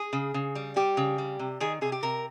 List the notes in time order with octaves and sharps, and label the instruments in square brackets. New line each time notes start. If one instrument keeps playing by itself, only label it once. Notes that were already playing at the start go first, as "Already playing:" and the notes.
Already playing: [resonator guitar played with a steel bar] G#4
C#3
C#3
G3
G3 G4
C#3
G3
C3
D#3 G#4
C3 G#4
G4
C3 A#4